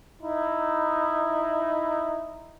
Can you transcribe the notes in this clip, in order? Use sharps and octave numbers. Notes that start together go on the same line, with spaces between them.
D#4 E4